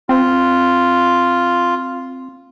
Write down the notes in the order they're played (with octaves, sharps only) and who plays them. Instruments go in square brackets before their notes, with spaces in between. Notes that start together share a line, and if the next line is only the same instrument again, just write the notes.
[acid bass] C4 [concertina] F4